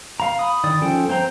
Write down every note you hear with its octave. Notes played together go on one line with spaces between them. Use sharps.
F5 A#5
B5 D#6
D#3 D5 D#6
F3 C#4 A4 G5
C4 C5 G5 A#5